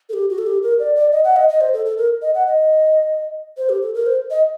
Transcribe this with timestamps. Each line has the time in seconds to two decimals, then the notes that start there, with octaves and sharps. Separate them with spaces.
0.09 A4
0.13 G4
0.30 F#4
0.38 A4
0.47 G4
0.63 A#4
0.79 D5
0.96 D5
1.12 D#5
1.24 F#5
1.36 D#5
1.49 D#5
1.61 C5
1.73 A4
1.85 A4
1.98 A#4
2.22 D#5
2.35 F#5
2.47 D#5
3.57 C5
3.69 G4
3.82 A4
3.95 A#4
4.06 C5
4.30 D#5